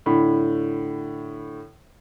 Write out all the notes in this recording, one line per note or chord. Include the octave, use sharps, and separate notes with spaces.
A2 D3 B5